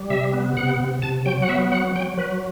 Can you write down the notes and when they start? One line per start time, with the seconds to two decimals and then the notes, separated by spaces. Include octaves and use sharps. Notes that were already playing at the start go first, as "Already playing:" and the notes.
Already playing: G3
0.10 C3 E5
0.33 B3
0.57 C3 F#5
0.80 C3
1.02 C3 A5
1.26 F#3 G5
1.42 F#5
1.48 B3 E5
1.71 F#3 F#5
1.96 F#3 G5
2.18 F#3 B4